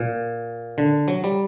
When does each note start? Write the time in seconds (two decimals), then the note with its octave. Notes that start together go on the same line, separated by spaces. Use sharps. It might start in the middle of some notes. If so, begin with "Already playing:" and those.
Already playing: A#2
0.78 D3
1.08 F#3
1.24 G3